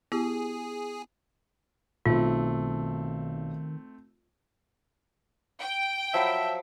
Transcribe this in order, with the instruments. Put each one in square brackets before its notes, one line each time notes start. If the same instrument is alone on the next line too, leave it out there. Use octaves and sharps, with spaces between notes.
[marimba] B3 E4 G4 [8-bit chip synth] G#4
[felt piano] B1 [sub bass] D#3 [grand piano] A3 C4 [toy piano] F4
[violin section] G5
[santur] F3 F#3 B5 [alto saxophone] E5